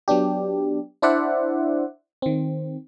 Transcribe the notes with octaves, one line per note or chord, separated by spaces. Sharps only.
F#3 B3 D4 G4
D4 E4 C5 D5 E5 F#5
D#3 C4